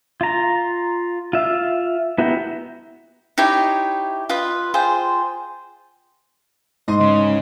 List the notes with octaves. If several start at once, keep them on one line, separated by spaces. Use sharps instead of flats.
F4 A#5
F4 E5 F5
B3 E4 F#4 G4 A#4
D#4 E4 G4 C#5
F4 B4 D#5 B5
F4 G#4 C5 G5
G#2 D#5 C6
C#3